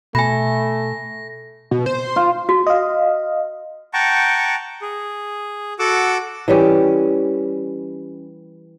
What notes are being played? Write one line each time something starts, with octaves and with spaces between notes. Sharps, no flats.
B2 A3 G#5 B5 A#6
B2
C5
F4
F#4
D#5 F5
F#5 G5 A5 A#5 C#6
G#4
F#4 A4 F#5 D6 E6
E3 G3 C#4 G4